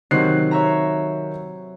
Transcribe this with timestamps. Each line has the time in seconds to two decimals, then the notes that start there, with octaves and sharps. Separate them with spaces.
0.11 C3 D#3 F#3 C4 F#6 C7
0.51 C#5 E5 A#5